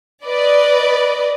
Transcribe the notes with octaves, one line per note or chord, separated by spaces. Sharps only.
B4 D5 D#5